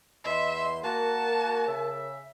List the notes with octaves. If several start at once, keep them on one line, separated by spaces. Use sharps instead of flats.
E2 E3 D#5 E5 C6
A#3 F#4 A#4 A5
C#3 E5